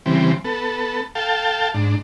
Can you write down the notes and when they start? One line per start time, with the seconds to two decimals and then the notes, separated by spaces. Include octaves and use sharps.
0.06 C#3 E3 G3 C4
0.45 B3 A4
1.15 A4 F5 G5 A5
1.74 G#2 D4